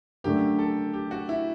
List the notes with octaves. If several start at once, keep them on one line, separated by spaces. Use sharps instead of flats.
F#2 D3 A3 G4
A4
G4
F#4
E4